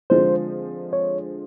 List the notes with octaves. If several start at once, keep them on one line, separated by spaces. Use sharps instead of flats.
D3 F3 G#3 C4 C5
C#5